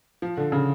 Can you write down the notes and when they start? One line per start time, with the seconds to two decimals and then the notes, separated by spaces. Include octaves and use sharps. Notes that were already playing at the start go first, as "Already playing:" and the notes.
0.22 F3
0.37 D3
0.52 C#3